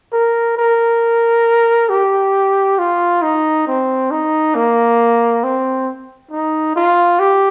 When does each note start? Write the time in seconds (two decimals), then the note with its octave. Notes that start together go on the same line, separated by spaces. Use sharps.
0.13 A#4
0.57 A#4
1.89 G4
2.79 F4
3.22 D#4
3.67 C4
4.11 D#4
4.55 A#3
5.44 C4
6.32 D#4
6.76 F4
7.20 G4